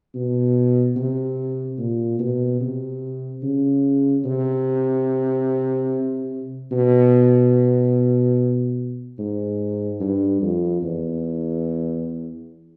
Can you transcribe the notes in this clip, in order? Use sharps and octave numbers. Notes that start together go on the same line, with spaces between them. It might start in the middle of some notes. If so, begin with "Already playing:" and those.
B2
C3
A#2
B2
C3
C#3
C3
B2
G#2
G2
F2
E2